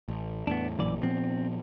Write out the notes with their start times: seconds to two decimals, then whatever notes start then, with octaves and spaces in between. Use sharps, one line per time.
0.08 A1
0.47 E2 A2 B3 D4
0.79 A1 F#2 A#2 E3 D5
1.03 A#2 F3 B3 C4